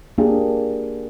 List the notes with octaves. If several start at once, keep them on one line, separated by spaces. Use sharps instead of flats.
A#3 D4 G4 G#4